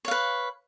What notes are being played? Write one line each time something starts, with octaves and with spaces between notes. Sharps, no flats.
B4 C#5 F5